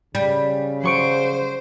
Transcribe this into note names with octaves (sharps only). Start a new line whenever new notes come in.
C#3 G3
F#3 C5 C#6 D7